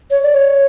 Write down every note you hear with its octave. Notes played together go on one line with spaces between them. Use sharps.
C#5
D5
C#5